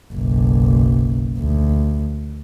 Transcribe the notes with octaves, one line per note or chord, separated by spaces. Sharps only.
F#1 B1
D2